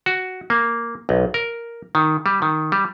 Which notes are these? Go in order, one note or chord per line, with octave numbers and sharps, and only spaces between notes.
F#4
A#3
B1
A#4
D#3
G3
D#3
G3